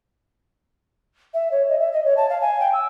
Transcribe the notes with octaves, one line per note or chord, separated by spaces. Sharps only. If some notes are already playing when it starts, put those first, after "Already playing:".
E5
C#5
D#5
E5
D#5
C#5
A5
F5
G#5
G5
E6